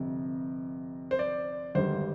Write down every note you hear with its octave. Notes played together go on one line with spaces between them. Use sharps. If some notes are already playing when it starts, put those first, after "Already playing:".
Already playing: G1 F2 C3
C5
D5
G#1 G2 D3 G3 C5